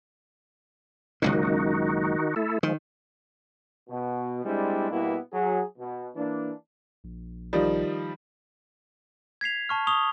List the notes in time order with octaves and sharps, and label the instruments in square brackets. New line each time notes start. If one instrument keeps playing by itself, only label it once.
[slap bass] F#1 C#2 A#2 [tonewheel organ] D#3 D#4 F#4
[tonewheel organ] A3 E4 A4
[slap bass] D#3 [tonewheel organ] F3 G#3
[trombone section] B2
G3 G#3 C4 D4 E4
B2 G3 A#3 B3 E4
F#3 G#4
B2
E3 A#3 D4
[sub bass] A#1
[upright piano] D#3 F3 G3
[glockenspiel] G#6 B6 C7 F7
A5 C#6 F6
C#6 D#6 F7 G7